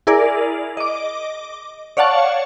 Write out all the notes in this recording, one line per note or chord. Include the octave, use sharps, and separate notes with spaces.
E4 G#4 A#4 D5
D#5 D6
C#5 D5 F5 F#5 A5 C#6